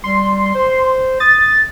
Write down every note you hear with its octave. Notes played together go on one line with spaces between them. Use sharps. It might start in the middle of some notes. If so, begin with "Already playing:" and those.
G3 C6
C5
D#6 A6